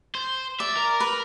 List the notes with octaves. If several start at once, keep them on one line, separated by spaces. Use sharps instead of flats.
C5
D5 E5
A#4
B4